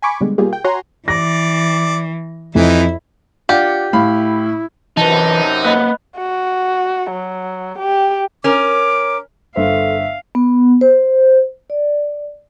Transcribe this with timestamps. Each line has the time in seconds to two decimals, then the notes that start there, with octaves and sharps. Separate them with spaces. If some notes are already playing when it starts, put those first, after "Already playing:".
0.02 G#5 B5 C#6 D6
0.21 B2 D3 G3 G#3
0.38 B2 G3 A#3 F4 G4 G#4
0.53 G5
0.64 F#4 C#5 F#5 G#5 A#5 C6
1.08 E3 D5 A#6
2.55 F2 E3 D#4 E4
3.49 D4 F4 G4 F#5
3.93 A2 E4 F5 B5
4.97 F#2 C3 E3 D#4 B4 D#5 A5
5.64 A#3 B4 D#5 F#5 B5 F#6
6.18 F#4
7.10 F#3
7.78 G4
8.44 C#4 A#4 D6
9.56 G1 A4 C5 E5 F5
10.35 B3
10.81 C5
11.70 D5